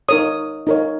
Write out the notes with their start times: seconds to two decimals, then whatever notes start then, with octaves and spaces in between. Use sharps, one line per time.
0.09 D#4 A#4 C#5 D#6
0.67 D#4 A#4 C#5